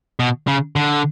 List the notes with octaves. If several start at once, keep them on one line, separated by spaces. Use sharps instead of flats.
B2
C#3
D3